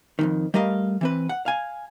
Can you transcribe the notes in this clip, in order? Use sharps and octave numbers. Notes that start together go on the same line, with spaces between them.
F2 G#2 D#3
G3 A3 A#4 D#5 F5
E3 C4 B4
F#5
F5 G#5